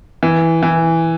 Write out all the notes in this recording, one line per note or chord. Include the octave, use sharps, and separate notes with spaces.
E3
E3